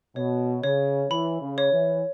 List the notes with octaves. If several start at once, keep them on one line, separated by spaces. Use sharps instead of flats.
B2 C#5
C#3 C#5
E3 B5
C#3
C#5
E3